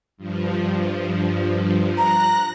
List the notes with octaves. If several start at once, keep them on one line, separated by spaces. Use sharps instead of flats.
G2 F3
A#5 F#6 A#6